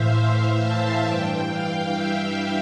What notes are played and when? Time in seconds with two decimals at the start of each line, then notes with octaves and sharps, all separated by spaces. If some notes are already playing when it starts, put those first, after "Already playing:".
Already playing: A2 E3 C5 E5 F5
0.20 F5
0.63 A5
1.05 G2 E3 G5
1.49 F5
1.92 E5